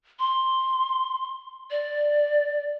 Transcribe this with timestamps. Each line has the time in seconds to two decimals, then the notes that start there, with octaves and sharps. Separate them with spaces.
0.19 C6
1.71 D5